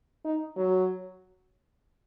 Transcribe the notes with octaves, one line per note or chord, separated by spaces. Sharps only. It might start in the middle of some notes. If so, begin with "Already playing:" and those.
D#4
F#3